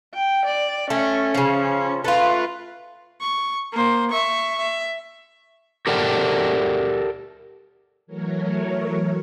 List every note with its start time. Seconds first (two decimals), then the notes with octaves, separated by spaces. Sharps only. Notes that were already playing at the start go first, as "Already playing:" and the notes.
0.14 G5
0.46 D5
0.90 A3 C#4
1.34 C#3 F3
2.04 A3 F4 B4
3.21 C#6
3.72 A#3 C5
4.11 E5 C#6
4.58 E5
5.87 G4 A4 A#4 D5 F#5 G5
8.07 E3 F#3 A3 A#4 C#5